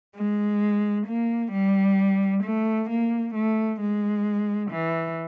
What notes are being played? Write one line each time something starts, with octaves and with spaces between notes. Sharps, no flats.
G#3
A#3
G3
A3
A#3
A3
G#3
E3